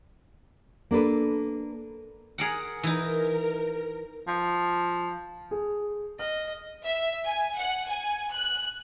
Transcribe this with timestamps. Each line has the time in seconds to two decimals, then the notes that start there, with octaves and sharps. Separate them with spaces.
0.91 A#3 D4 A4 B4
2.38 G#4 A#4 F#5
2.83 E3 D#4 A#4
4.28 F3
5.51 G#4
6.19 D#5 F6
6.85 E5
7.26 G#5
7.58 F#5
7.89 G#5
8.34 F#6